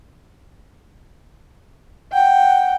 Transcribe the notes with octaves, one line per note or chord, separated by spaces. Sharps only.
F#5 G5